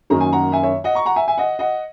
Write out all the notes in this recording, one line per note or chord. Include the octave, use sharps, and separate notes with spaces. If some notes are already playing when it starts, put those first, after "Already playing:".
F#2 D#3 A#3 C#4 A#5
G#5
F#5 A#5
E5 G#5
C#5 E5
D#5 F#5
A#5 C#6
F#5 A#5
E5 G#5
E5 G#5
D#5 F#5
D#5 F#5